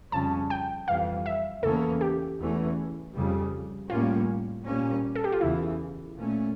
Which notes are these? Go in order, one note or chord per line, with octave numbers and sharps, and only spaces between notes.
F2 C#3 G3 C#4 A5
G5
F2 E3 G3 F5
E5
E2 C#3 E3 A#3 C#4 A4
G4
E2 E3 A3 C#4
F2 C#3 G3
A2 G3 A#3 C#4 F4
A#2 G3 A#3 C#4
A4
G4
F4
E2 C#3 E3 E4
A#2 A3 C#4